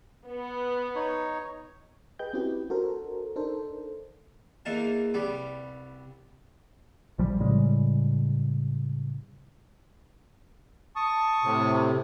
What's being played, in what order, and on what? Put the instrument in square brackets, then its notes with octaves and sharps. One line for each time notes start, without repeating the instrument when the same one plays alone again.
[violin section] B3
[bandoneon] D#4 C#5
[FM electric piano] G#4 B4 D#5 G5 G6
C4 C#4 E4 F#4 G4 B4
D4 F#4 A4 A#4 C5
D4 D#4 A4 A#4 C5
[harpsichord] E2 E3 A#3 D#4 A#4 A5
C2 G3 B3 D6
[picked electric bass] A#1 F3 G3
A2 C#3 G3 G#3
[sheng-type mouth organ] A5 C#6 D#6
[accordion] A2 C3